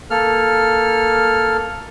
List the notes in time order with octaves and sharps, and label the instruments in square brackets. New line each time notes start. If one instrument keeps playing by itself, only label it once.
[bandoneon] A#3 A4 F6